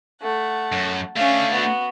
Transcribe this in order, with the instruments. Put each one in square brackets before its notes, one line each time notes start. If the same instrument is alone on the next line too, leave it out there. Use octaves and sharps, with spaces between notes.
[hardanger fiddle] A3 F#5
[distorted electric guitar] F#2
[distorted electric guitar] A3 D4 [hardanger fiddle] C#4 F5
[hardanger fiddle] B3 F#4